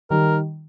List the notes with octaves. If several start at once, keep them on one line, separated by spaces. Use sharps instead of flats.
D#3 G3 A#4